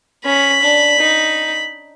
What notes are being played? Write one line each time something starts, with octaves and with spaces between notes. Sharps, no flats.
C#4 B5
D4
D#4